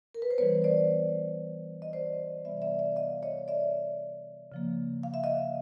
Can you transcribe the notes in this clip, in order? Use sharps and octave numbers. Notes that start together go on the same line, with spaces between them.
A#4
B4
C5
E3 G3 B3 B4 C#5
C5 D5
D#5
C5 D5
C3 E3 G3 B3 D5 E5
D5 E5
D5 E5
D#5 F5
C#5 D#5
D5 E5
C#3 F3 A#3
F5
E5
D#5 F5